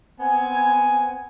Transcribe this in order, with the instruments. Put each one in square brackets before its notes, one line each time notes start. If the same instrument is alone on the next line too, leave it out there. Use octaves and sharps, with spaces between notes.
[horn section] B3 C4 G#5